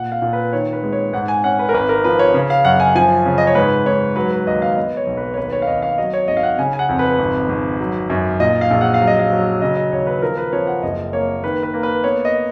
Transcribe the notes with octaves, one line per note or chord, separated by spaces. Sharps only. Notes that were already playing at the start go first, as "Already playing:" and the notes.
Already playing: A#2 F#5
F5
A#2
B4
D#3 C#5
B4
G#3
C#5
G#2 F#5
G#5
C#4 F#5
B4
A#4
G#1 B4
A#4
F3 B4
C#5
C#3
F5
F#2 F#5
G#5
F3 G#5
C#3
D#5
C#5
G#2 B4
G#2 C#5
F#3 B4
B4
D#2 D#5
F5
B3 D#5
C#5
B1
B4
C#5
D#2 B4
C#5
F5
D#2 D#5
F5
F#3 D#5
C#5
G#1 D#5
F5
F#5
C#3 G#5
G#5
F#5
F2
B4
G#1
G#1
F#3
F#2
A#2 D#5
F5
A#1
F#5
F5
F#3
D#5
F5
F#3
C#3 D#5
D#5
D#2 C#5
B4
F3 A#4
B4
F3 C#5
F#5
F#1 D#5
A#3 C#5
D#3 B4
B4
A#3
B4
B3 C#5
D#5